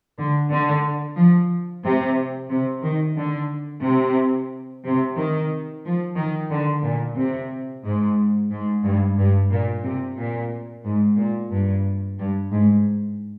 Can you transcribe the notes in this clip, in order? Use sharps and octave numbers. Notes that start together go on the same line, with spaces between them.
D3
D3
F3
C3
C3
D#3
D3
C3
C3
D#3
F3
D#3
D3
A#2
C3
G#2
G#2
G2
G2
A#2
C3
A#2
G#2
A#2
G2
G2
G#2